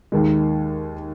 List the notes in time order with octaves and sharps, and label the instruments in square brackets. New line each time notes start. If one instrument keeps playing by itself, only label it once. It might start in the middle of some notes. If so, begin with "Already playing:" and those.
[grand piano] D#2 D#3 G#3